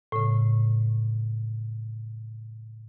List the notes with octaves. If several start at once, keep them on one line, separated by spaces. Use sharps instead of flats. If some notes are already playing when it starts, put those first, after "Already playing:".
A2 C#3